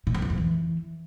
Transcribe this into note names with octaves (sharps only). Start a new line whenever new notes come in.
A#2
F2
E2
F2
E3